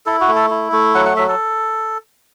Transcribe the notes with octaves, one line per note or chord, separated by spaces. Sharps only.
E4 A4
F#4
A3
A4
E4
A3
F#3 F#5
F#5
F#3 E5
A4